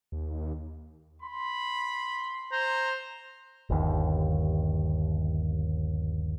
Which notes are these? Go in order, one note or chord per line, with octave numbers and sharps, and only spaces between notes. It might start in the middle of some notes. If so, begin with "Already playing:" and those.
D#2
B5 C6
C5 A#5
G1 D#2